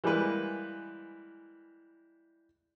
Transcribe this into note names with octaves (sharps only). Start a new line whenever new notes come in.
E3 G3 G#3 A#3 B4